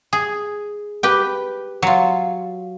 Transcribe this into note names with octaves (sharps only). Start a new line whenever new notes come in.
G#4
G4 B4 G5
F#3 F4